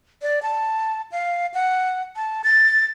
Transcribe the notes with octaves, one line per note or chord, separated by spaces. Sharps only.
D5
A5
F5
F#5
A5
A6